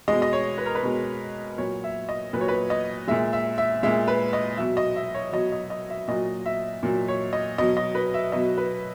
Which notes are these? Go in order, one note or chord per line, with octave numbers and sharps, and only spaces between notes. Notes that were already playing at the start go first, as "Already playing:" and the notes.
B2 G#3 D#5
D#5
C#5
B4
A#4
B4
B2 G#3
A#2 F#3 C#5
E5
D#5
A#2 F#3 B4 C#5
B4
D#5
A#2 G#3 E5
E5
E5
A#2 G#3 E5
B4
D#5
B2 F#3 E5
D#5
E5
C#5
B2 F#3 D#5
D#5
D#5
E5
A#2 F#3 D#5
E5
A#2 F#3
C#5
D#5
B2 F#3 D#5
D#5
B4
E5
B2 F#3 D#5
B4